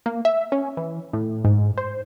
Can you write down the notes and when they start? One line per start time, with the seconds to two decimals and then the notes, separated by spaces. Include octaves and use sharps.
0.06 A#3
0.25 E5
0.52 C#4
0.77 E3
1.13 A2
1.45 G#2
1.78 C5